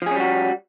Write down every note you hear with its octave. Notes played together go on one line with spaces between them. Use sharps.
F3 G3 C#4 F#4 G#4